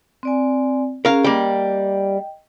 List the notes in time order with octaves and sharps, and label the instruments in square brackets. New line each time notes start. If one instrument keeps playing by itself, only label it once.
[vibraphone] C4 D5 G#5
[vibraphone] C#4 G#4 [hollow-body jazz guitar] A#4 F5
[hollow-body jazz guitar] G3 A#3 [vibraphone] D#5 G5